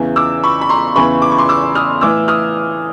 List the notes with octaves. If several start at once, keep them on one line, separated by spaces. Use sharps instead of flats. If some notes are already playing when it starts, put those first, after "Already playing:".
Already playing: E2 C#3 E3
D6 E6
B5 C#6
B5
A#5 C6
E2 C#3 E3 B5 C#6
D6
C#6
C6 D6
D6 E6
D#6 F6
A2 E3 D6 E6
D#6 F6